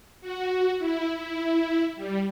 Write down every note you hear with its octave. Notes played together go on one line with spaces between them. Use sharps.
F#4
E4
E4
G3